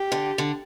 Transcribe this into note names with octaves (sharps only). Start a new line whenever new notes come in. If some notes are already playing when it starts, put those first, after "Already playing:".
Already playing: G4
D3
D3